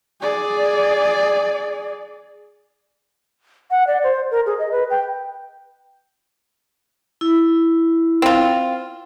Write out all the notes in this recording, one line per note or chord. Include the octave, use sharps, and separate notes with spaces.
G#4 D5
F#5
D5
C5
A#4
G#4
D#5
B4
G5
E4
C4 F4